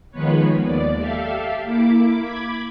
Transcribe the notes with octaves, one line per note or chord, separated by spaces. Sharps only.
D#3 F3 G#3 B3 B4 C#5
D#2 D5
G4 A4 E5 F5
A#3 E4 D6
B5 D6 G#6